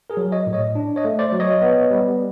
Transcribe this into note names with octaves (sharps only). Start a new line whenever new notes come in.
G#4 A#4
F#3
C#5 D#5
A2
C#5 D#5
D4
C#5 D#5
A3
C5 D5
F#3
C#5 D#5
B3
G3